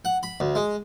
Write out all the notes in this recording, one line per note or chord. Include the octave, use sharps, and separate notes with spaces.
F#5
B5
D2
G#3